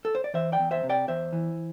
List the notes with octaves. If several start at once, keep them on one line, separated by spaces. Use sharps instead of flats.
A4
C5
D5
E3 C5 E5
D5 G5
E2
C5 E5
C3
D5 G5
E2 C5 E5
E3